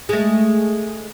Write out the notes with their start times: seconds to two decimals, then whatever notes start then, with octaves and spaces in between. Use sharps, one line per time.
0.09 G#3 A3